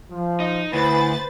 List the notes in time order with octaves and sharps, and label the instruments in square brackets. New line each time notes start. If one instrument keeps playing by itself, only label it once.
[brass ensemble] F3
[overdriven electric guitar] D#4
[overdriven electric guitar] D2 [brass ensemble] E4 G#4 [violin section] B4 C5 A6